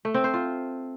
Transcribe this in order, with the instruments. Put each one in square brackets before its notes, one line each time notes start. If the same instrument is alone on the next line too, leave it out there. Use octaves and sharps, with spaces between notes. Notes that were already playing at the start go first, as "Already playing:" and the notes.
[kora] A3
C4
C5
F4